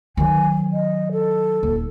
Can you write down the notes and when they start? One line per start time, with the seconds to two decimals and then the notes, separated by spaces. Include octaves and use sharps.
0.17 D#3 F#3 G#5
0.73 D#5
1.12 A4
1.63 D#1